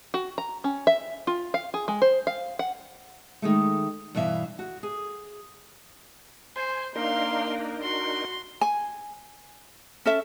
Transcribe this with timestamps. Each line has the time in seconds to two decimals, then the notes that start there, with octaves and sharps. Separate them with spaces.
0.14 F#4
0.38 A#5
0.64 C#4
0.87 E5
1.27 F4
1.54 F5
1.74 G#4
1.88 G#3
2.02 C5
2.27 F5
2.59 F#5
3.42 D#3 G#3 A3
4.15 G2 B2 E3 E5 F5
4.59 F#4
4.83 G#4
6.56 C5 G#5 C6
6.96 A#3 D4 D#4 A#4 F5 C6
7.82 F#4 C6
8.61 G#5
10.06 C#4 A4 E5